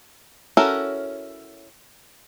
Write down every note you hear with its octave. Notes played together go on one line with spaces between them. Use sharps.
C#4 E4 F#4 A4 A#4